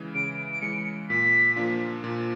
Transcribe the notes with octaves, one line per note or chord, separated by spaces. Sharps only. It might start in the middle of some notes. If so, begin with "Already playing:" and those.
Already playing: C#3 E3 G#3
C#3 D7
D7
E3 G#3 C#7
A#2 B6
F3 A#3 D4 F4
A#2